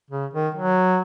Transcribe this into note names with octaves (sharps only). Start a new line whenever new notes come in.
C#3
D#3
F#3